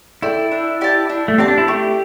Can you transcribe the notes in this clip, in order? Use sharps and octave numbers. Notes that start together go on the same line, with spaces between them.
E4 A4 D5 G5
D4
G4 D5 A5
D4
A3
C4 G4 D5 A5
D4
E4
A3 G4